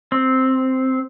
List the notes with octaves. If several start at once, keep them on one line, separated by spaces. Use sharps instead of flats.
C4